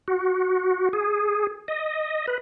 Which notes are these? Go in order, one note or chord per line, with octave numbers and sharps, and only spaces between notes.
F#4
G#4
D#5
B4